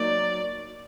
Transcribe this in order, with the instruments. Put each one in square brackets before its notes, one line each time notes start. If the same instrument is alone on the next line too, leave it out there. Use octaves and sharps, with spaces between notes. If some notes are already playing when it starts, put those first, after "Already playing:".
Already playing: [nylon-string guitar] F#3 A#3 D#4 [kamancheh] D5